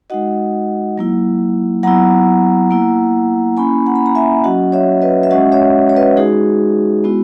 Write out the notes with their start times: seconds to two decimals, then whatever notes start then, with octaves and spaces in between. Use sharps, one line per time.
0.10 G#3 D#4 F#4 D#5 F#5
0.98 F#3 A#3 E4
1.83 F#3 B3 E4 F#5 A#5
2.71 A#3 E4
3.57 A#3 C#4 E4 G#5 B5
3.86 F#5 A#5
3.96 B5
4.06 A#5
4.15 E5 G#5
4.44 F#3 C#4 F#4 D#5 F#5
4.72 C#5 E5
5.02 B4 D#5
5.23 E5
5.31 G#3 C#4 F#4 D#5 F#5
5.52 C#5 E5
5.90 C#5
5.96 B4 D#5
6.17 G#3 D#4 F#4 G#4
7.04 G#3 B3 E4 F#4